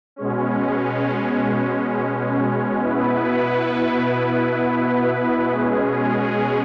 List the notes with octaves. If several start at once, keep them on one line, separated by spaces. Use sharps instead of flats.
B2 G#3 C#4
B2 B3 E4 B4
B2 G#3 C#4 G#4